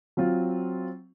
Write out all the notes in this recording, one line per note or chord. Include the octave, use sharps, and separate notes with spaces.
F#3 C4 F4